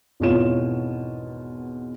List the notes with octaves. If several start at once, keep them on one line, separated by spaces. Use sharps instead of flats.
G#1 E2 B2 F4 C#5 E7